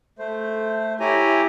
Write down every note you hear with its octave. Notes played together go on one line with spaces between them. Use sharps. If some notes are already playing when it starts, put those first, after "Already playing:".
A3 C5
E4 G4 C#5 G#5 A#5